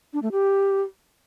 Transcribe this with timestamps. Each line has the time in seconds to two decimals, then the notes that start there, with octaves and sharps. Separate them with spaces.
0.13 D4
0.22 A3
0.32 G4